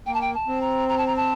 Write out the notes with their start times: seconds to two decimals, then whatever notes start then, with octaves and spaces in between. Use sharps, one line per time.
0.06 A#3 G5
0.14 A5
0.21 G5
0.34 A5
0.48 C4
0.61 A#5
0.88 A#5
0.98 A5
1.06 A#5
1.16 A5